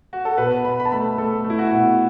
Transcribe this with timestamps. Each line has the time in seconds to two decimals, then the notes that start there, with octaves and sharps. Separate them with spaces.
0.13 F#4
0.25 A4
0.38 B2 B4
0.65 B2 B5
0.80 B5
0.85 A5
0.92 A3 B5
1.18 A3 A4
1.44 A3
1.50 E4
1.59 F#4
1.72 B2